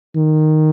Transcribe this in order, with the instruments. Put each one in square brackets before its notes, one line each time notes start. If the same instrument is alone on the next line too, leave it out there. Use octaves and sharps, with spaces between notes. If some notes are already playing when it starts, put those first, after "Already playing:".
[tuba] D#3